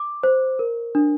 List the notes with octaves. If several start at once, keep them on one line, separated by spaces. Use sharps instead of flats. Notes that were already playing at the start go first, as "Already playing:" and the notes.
Already playing: D6
C5
A#4
D4